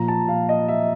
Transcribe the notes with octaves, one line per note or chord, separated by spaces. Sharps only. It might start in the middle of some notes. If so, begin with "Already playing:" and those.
Already playing: A#2 F3 A#5
A5
F5
D#5
E5